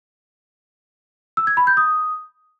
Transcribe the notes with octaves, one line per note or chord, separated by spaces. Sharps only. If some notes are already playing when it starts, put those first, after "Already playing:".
E6
G#6
B5
G6
D#6